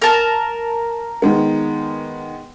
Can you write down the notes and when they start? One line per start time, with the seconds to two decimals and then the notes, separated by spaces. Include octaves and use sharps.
0.02 A#4 A5
1.22 D#3 G#3 B3